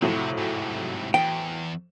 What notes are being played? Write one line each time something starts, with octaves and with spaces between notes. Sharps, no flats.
F2 A2 C3 F#3
G#2 C3
E2 G5